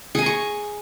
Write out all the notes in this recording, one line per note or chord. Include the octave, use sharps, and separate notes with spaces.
G#4 G#5 A#5 C#6